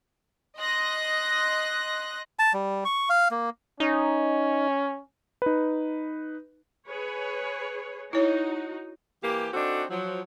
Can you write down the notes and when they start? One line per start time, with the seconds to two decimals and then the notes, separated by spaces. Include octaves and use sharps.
0.58 D#5 C6 F#6 A#6
2.39 A5
2.53 G3
2.85 C#6
3.10 F5
3.31 A#3
3.80 C#4 D#4
5.42 D#4 B4
6.86 G#4 B4 C#5
8.13 D#4 E4 F#4 C#5
9.24 E3 A#3 G4
9.53 C4 D4 D#4 F#4 A4
9.90 F3 F#3